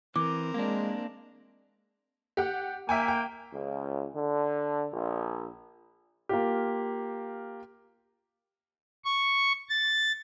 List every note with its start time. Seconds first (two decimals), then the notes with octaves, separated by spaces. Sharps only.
0.16 E3 C4 A#4 D6
0.54 G#3 A#3 D4
2.37 G4 F#5
2.89 A#3 E5 G5 G#5
3.08 G5
3.52 C#2
4.16 D3
4.92 A#1
6.29 A#3 F4 G4
9.05 C#6
9.69 A6